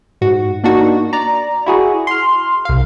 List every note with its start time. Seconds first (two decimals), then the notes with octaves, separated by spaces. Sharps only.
0.21 G#2 F#4
0.64 A#3 D4 D#4 F#4
1.13 D5 A#5
1.66 E4 F#4 G#4
2.07 C6 F6
2.65 C2 F5